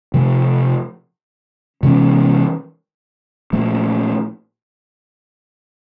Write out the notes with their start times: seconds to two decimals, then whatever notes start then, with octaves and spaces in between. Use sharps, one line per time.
0.14 C3 F3 A3
1.83 C3 E3 G#3 C#4
3.53 A#2 F3 A3